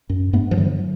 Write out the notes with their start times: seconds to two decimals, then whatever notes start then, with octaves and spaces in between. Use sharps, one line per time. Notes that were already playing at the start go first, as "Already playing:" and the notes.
0.09 F#2
0.33 G2 A3 B3
0.51 F3
0.57 D3 E3 F#3